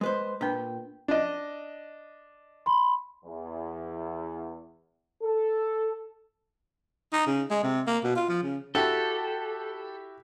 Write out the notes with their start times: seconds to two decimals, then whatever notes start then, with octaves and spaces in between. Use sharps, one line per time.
0.01 G#3 B4 C5
0.41 A#2 D4 B4 G5 B5
1.08 D4 D#5
2.66 B5 C6
3.25 E2
5.22 A4
7.13 D#4
7.27 C#3
7.51 G#3
7.63 C3
7.87 A#3
8.04 B2
8.16 F4
8.29 F3
8.43 C#3
8.75 E4 F#4 G4 A4